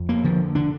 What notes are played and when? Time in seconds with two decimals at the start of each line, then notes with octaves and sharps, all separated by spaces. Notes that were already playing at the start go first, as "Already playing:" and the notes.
Already playing: F2
0.09 A#3
0.24 D3 F3
0.55 D3 D4